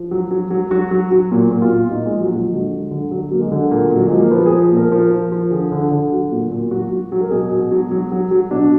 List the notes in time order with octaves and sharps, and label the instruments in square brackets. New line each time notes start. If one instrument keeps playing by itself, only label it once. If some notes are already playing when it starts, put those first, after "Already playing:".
Already playing: [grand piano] F3
F#3
F#3
F#3
F#3 F#4
F#3
F#3
A#2
A#2
F4
A#2
A#2 D#4
G#3
F3
F#3
A#2 F#3
D3 G#3
F#3
D3
D3 F#3
F#3 A#3
G#3
D3
A#2 A#3
A#2 F#3
F3 G#3
A#3
F3 B3
F3 G#4
A#2
A#4
F3 A#4
F3
F3
D3 G#4
D3
D3
F#3 F#4
A#2
A#2
F#3 F#4
F#3
F#3
A#4
B2 G#4
B2
F#3
F#3
F#3
F#3
B2 D4